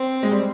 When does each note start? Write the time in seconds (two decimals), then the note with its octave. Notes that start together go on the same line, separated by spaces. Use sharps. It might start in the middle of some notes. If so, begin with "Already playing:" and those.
Already playing: C4
0.23 G#3
0.31 G3